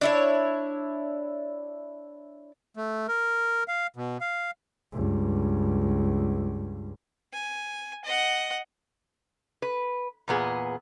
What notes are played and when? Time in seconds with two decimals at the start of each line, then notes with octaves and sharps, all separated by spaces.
0.01 D4 E4 C#5
2.76 A3
3.08 A#4
3.68 F5
3.96 B2
4.21 F5
4.92 C#2 G2
7.33 G#5
8.05 D#5 F#5
9.62 B4
10.28 E2 A#2 B3 G#4